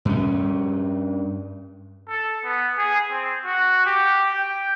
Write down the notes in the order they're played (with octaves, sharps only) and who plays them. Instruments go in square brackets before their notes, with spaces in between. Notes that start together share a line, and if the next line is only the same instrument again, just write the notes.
[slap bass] G2 C#4
[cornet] A4
B3
G#4
C4
F#4
G4
G5